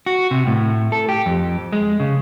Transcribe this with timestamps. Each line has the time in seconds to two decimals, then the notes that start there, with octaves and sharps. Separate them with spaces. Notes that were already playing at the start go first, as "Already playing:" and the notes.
0.06 F#4
0.31 C3
0.47 A2
0.92 A4
1.09 G4
1.26 F2
1.72 G#3
2.00 C#3